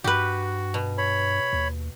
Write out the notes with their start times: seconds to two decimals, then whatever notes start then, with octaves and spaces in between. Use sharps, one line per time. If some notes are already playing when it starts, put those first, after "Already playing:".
0.04 G2 F#4 G4 B4
0.74 B2
0.98 C#5 B5
1.53 D#2